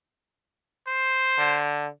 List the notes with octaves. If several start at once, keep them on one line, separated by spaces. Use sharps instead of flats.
C5
D3